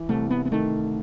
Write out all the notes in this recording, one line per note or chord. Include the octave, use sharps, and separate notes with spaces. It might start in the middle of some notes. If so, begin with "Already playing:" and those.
Already playing: E3
C2 A3
B3
B3
D#3 A3